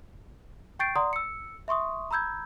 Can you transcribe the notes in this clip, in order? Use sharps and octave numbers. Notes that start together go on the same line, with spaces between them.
G5 C#6 G6 A6 C7 D7
D5 F#5 A#5 C6 D#6
E6 C#7
E5 C6 C#6 D#6
A#5 B5 E6 G6 G#6